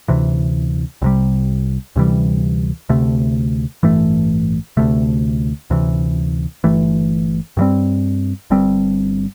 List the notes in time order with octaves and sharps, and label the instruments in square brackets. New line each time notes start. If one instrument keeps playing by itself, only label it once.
[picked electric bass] D2 C3 E3
C2 C3 G3
D2 C3 E3 G3
D2 C3 A3
A1 G2 E3 A3
D2 C3 A3
D2 C3 E3
G1 G2 E3 A3
G2 E3 G3 C4
G1 G2 G3 C4